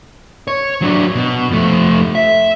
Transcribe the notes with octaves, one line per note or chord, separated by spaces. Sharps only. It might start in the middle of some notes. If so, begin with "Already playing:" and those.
C#5
F#3 D4
B2
F2 A3
E5